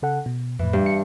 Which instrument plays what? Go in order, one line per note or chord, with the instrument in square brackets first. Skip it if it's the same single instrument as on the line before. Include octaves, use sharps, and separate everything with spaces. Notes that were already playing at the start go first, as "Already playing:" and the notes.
[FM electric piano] C#3 A4 F#5
B2
[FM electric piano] F2 A2 [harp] E3
[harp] G2
[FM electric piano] C#7